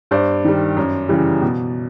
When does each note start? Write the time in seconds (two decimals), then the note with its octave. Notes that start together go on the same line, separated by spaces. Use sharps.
0.11 G2 C5 D5
0.45 D#3 G3
0.77 F#2
1.09 C#3 E3 G3
1.42 B2